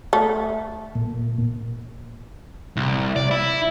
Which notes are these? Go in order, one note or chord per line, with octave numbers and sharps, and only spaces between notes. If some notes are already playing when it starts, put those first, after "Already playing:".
A3
A#2
C2
D5
E4